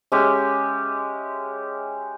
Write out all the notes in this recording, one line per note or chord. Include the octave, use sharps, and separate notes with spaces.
G#3 C#4 G4 E5